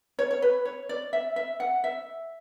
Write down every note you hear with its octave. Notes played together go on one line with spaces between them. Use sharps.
C#5
C#5
B4
C#5
D5
E5
E5
F#5
E5